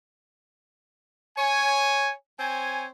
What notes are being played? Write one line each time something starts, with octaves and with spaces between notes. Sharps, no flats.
C#5 G#5
C4 C5 C#5 G#5